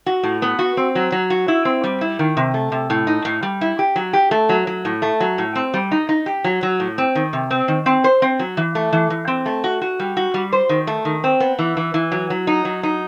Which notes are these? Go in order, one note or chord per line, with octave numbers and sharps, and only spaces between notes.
F#4
A2
B3
F#4
C4
F#3
F#3
F#4
E4
C4
G3
E4
D#3
C3
A3
C3
A2
D#4
A2
G3
E4
G4
F#3
G4
A3
F#3
F#3
A2
A3
F#3
A2
C4
G3
D#4
D#4
G4
F#3
F#3
A2
C4
D#3
C3
C4
D#3
C4
C5
C4
F#3
E3
A3
E3
E3
C4
A3
F#4
F#4
G3
F#4
G3
C5
D#3
A3
D#3
C4
B3
E3
E3
E3
F#3
F#3
D#4
F#3
D#4